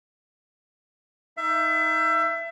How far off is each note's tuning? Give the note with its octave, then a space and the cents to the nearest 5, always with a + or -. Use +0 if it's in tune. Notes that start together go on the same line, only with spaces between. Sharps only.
D#4 +15 E5 +30